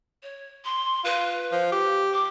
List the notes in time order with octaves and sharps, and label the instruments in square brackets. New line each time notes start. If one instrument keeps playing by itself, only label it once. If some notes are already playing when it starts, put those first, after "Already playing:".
[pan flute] C#5
C6
[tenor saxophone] F4 [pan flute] B4
[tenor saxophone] F3
G4
[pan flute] D6